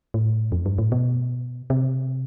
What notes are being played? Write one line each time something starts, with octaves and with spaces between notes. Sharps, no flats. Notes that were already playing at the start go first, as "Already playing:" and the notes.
A2
F2
G2
A2
B2
C3